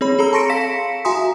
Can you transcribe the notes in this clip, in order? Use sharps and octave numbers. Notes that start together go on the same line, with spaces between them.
C4 G#4 C#5 B5
G#4 A4 A#5 E6
A5 C6 C#6 A#6 C#7 D7
F5 A#6 B6 C#7 E7
F#4 E5 G#5 A#5 C6 D#6